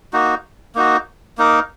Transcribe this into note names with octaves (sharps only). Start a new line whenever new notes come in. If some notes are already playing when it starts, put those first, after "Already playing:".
A#3 D#4 F#4
A#3 D#4 F#4
A#3 D#4 A#4